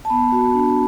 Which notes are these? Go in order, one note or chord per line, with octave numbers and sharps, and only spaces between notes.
A5
B3 B5
F#4
D4